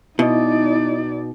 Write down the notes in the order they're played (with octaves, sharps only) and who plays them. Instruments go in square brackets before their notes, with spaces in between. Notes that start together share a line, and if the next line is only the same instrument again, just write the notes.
[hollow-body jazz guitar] B2 [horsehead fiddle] D#4 D5 [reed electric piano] E4 D#5